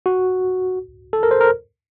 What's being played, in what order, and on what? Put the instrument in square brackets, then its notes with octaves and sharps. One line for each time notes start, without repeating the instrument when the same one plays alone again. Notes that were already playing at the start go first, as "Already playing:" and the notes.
[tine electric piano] F#4
A4
A#4
C5
A#4